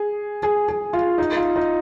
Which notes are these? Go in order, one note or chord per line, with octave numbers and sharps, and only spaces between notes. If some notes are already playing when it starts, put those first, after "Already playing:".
Already playing: G#4
G#4
G#4
F4
D#4
F4
D#4